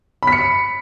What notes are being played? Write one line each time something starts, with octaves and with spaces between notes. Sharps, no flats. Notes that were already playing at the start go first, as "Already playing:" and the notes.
B5 B6 C#7